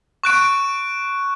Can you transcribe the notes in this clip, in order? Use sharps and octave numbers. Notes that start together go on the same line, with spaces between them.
C#6 F#6 D7